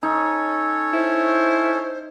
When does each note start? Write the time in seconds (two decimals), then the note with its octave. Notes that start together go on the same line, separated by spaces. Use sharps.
0.03 C#4 D#4 A4 C#5
0.94 E4 C5